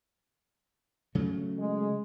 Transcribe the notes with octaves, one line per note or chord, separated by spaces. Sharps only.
C#3 F#3 A3
G#3